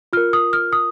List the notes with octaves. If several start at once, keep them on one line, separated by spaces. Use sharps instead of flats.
F4 A#4 F6
D#6
F6
D#6